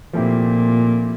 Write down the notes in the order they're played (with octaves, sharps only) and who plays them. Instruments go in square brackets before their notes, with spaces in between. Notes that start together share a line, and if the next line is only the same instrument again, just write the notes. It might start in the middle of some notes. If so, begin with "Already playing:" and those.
[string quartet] A#2 [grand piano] F3 A3 C4 E4 G4